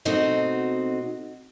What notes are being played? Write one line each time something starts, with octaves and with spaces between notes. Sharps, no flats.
B2 A3 C4 D#4 F#4